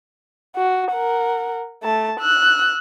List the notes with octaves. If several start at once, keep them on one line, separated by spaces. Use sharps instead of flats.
F#4
A#4 F#5
A3 A5
E6 F#6